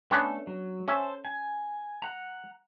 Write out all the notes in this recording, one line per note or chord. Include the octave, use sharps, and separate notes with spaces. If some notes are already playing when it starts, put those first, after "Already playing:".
A3 B3 C#4 D4 A4
F#3
C#4 A4 C5 E5
G#5
F#5 A#5